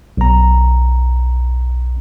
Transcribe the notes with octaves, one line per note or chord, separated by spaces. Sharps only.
B1 A#5